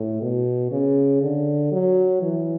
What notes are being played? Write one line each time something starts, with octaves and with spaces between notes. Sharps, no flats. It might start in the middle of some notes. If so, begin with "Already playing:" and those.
Already playing: A2
B2
C#3
D3
F#3
E3